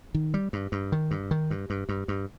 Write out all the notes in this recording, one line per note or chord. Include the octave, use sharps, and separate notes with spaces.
D#3
G3
G2
G2
D#3
G2
D#3
G2
G2
G2
G2